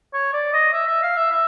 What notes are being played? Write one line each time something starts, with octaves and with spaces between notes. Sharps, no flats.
C#5
D5
D#5
E5
E5
F5
E5
E5